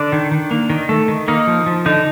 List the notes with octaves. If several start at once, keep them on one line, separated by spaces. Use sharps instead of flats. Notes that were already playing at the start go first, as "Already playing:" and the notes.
Already playing: D3 D4 D5
D#3
D#3
A#3
D#3
A3
D#3
A#3 D#4
F3
F3
D3 D#4